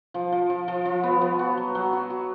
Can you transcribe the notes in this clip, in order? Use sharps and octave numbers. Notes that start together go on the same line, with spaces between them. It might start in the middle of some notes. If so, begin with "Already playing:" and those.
F3
F3
F3
F3
F3
B3
B3
F#4
F#3
F#3
F#4
F#4